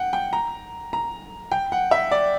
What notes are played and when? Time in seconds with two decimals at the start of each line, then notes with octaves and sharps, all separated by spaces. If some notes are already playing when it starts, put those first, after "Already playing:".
Already playing: F#5 G5
0.13 G5
0.33 A#5
0.93 A#5
1.52 G5
1.72 F#5
1.91 E5
2.11 D5